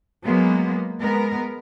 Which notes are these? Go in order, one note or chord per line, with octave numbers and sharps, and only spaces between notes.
F#3 G#3 A#3 B3
G#3 B3 A#4